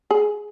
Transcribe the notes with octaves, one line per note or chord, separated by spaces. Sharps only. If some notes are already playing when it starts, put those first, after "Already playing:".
G#4